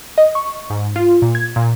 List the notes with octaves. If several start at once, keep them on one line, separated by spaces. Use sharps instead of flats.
D#5
C#6
G#2
F4
A#2
G#6
A#2